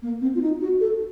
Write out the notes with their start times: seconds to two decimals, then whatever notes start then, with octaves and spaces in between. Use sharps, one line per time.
0.02 A#3
0.21 C4
0.35 F4
0.41 D#4
0.61 F#4
0.81 A4